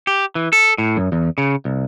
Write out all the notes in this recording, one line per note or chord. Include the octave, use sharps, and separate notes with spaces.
G4
E3
A4
A2
F#2
E2
C#3
C2